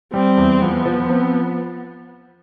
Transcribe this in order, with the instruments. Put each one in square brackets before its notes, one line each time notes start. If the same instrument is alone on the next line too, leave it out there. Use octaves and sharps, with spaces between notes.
[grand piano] G3 [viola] C4
[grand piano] E2
[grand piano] F3 [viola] B3
[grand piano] F3
C4